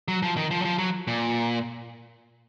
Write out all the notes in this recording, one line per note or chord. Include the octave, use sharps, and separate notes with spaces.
F#3
F3
D#3
F3
F#3
F3
F#3
A#2